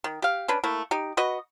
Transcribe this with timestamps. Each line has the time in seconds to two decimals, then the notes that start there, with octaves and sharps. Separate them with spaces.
0.04 D#3
0.22 G4 F5
0.48 C#4 D4 B4
0.64 A3 A#3 E4
0.91 D#4 G4
1.17 F#4 B4 D#5